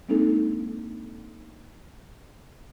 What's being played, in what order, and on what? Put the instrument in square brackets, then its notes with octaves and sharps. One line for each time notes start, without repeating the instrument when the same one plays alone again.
[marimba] G#3 A#3 C4 D4 D#4 A4